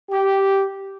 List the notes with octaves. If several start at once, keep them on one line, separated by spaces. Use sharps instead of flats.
G4